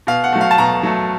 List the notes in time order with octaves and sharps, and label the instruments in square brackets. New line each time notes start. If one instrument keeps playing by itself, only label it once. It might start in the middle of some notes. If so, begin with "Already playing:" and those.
[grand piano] B2 F5
F#5
F#3 A3
F5
A5
B2 A#5
F#3 A3